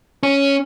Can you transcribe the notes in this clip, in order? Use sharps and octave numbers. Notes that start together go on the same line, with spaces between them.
C#4